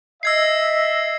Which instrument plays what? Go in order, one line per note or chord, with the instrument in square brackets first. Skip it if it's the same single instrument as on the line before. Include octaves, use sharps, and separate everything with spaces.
[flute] D#5 [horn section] E5 [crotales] E6 G#6 C7